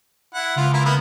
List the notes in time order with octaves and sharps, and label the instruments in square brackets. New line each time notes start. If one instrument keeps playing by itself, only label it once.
[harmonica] E4 F#5
[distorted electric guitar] C#2 [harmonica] F4
[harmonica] E4 F4 A#4
A#3 B3 B5